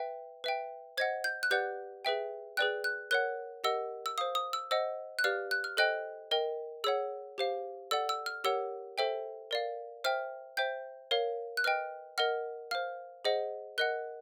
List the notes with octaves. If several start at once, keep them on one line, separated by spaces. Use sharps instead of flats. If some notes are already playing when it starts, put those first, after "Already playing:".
Already playing: B4 E5 G5
B4 E5 G5
C5 D#5 F#5 G#6
G6
F#6
G4 B4 D5 F#5 G6
G#4 B4 E5 G5
G#4 B4 D5 G5 F#6
F#6
A#4 C#5 F#5 F#6
G4 A#4 D#5 F#5 E6
E6
C5 F5 D#6
D#6
E6
C5 D#5 F#5 E6
F#6
G4 B4 D5 F5 F6
F#6
F6
A4 C5 D#5 G5 F#6
A#4 D#5 G5
G#4 C#5 F#5 E6
G4 C5 F5
A4 D5 F#5 E6
E6
F6
G4 A#4 C#5 F#5 E6
A4 C5 E5 G5
A#4 D5 F5
C5 E5 G5 F6
C5 E5 G5 G6
A#4 C#5 F5
F#6
B4 D#5 G5 F6
A#4 D#5 F#5 F6
C5 F5 F6
G#4 C5 D#5 F#5
A#4 D#5 F#5 F#6